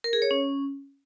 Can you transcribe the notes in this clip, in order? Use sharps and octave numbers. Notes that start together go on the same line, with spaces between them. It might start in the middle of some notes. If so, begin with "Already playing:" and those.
A#4
G#4
C#5
C#4